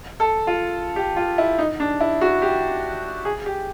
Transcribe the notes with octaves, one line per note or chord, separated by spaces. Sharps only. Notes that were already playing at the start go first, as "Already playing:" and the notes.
A4
F4
G4
F4
E4
D#4
D4
E4
F#4
G4
G#4
G4